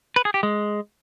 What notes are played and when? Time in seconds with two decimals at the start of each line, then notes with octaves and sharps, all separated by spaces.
0.16 B4
0.25 G#4
0.34 G4
0.43 G#3